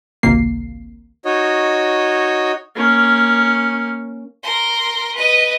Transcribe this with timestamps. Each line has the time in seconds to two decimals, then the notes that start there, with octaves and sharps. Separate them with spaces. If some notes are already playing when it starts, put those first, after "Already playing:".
0.23 G#1 C#2 C3 A#3 C7
1.25 D#4 F#4 C#5 D#5
2.75 A#3 C#4
4.43 A#4 C6
5.14 B4 D#5